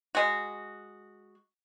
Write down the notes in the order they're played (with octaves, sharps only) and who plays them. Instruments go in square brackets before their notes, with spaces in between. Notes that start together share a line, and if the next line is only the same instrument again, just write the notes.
[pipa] G#3 F#4